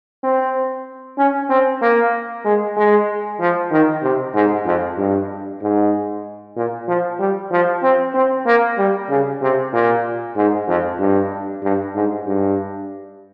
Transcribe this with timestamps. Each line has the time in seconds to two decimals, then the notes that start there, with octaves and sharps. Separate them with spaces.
0.23 C4
1.18 C#4
1.50 C4
1.81 A#3
2.45 G#3
2.76 G#3
3.40 F3
3.71 D#3
4.03 C3
4.34 G#2
4.66 F2
4.98 G2
5.62 G#2
6.56 A#2
6.88 F3
7.19 G3
7.51 F3
7.83 C4
8.14 C4
8.46 A#3
8.78 G3
9.09 C#3
9.41 C3
9.73 A#2
10.36 G#2
10.68 F2
11.00 G2
11.63 G2
11.95 G#2
12.26 G2